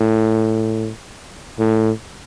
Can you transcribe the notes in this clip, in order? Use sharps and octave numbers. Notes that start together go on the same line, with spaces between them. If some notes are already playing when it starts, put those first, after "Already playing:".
Already playing: A2
A2